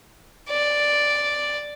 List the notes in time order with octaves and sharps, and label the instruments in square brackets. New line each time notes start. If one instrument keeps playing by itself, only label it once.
[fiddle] D5